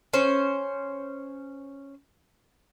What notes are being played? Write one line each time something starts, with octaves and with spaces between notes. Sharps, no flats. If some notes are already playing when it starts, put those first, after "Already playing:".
C#4 C5